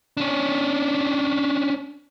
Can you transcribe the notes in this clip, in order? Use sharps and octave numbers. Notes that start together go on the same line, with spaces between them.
C#4 D4